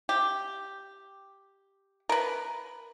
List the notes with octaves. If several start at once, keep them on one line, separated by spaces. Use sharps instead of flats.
G4
A#4 B4